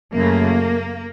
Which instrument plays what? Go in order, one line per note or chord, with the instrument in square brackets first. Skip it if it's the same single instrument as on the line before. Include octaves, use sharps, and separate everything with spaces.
[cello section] F#2 C#3 A3 A#3